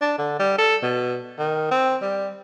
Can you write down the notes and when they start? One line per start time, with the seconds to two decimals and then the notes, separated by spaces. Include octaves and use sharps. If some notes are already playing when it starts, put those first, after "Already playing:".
0.01 D4
0.18 D3
0.39 G3
0.58 A4
0.82 B2
1.38 D#3
1.71 C4
2.02 G3